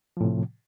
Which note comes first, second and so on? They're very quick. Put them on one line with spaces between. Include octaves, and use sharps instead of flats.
F3 A2 C3